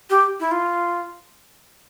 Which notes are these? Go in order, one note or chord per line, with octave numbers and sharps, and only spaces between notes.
G4
E4
F4